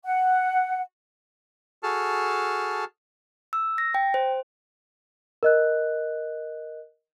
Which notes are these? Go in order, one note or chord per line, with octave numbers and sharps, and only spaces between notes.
F#5
F#4 G#4 A4 A5 F6
E6
A#6
G5
C5
A#4 D#5 F#6